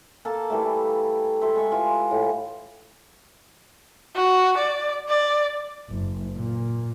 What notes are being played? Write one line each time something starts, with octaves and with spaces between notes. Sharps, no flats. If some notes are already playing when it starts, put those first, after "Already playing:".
A#3 A4 A5
E3 G3 A3
A4 C5 E5
G#3 C#6
E3 F4
A2
F#4
D5
D5
F#1
A#2